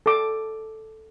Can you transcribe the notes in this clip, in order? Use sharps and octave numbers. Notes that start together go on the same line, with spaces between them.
A4 D6